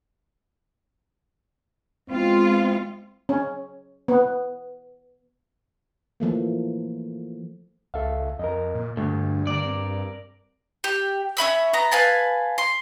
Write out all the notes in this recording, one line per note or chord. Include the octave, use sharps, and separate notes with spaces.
G#3 B3 C4 F4
C#4
B3
E3 F3 A3 A#3
C#2 A4 E5 F5
F2 A#4 D#5
A#2
D2 G2 A3
D3 A#4 D5
C4
G4
C#4 E5 B5 E6
B3 A#5
B4 F5 G#5 A5
C6